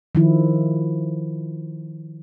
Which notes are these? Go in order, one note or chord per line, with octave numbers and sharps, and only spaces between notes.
D#3 F3 E4